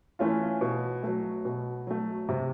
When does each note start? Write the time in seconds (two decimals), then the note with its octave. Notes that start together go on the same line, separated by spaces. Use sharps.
0.19 E3 A3 C#4 F4
0.61 B2
1.03 F#3 A3
1.45 B2
1.87 F#3 A3
2.29 C3